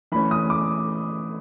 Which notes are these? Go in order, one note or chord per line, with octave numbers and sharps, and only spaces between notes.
E3 A3 C#4 B5
D#6
D6